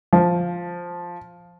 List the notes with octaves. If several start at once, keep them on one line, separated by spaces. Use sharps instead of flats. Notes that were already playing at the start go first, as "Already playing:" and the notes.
F3